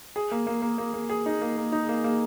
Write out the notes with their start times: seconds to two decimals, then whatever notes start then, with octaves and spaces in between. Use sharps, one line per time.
0.16 G#4
0.32 A#3
0.47 A#3
0.62 A#3
0.78 A#3
0.94 A#3
1.10 G#4
1.26 D#4
1.41 A#3
1.57 A#3
1.72 D#4
1.89 A#3
2.04 A#3